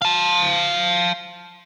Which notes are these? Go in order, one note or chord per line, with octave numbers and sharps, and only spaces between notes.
F5 A5